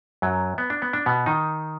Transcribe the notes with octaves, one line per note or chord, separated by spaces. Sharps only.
F#2 F#3
B3
D4
B3
D4
B2 B3
D#3 D#4